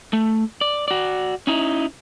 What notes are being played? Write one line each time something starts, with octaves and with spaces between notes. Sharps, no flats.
A3
D5
F#4 D5
C#4 D#4 E4